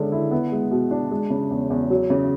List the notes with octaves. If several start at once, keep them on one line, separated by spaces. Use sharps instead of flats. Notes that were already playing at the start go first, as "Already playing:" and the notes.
Already playing: D3 G#3 C#4
E4
B3
G#3
B2
D4
G#3
C#3
E2
E2
F#3
C#3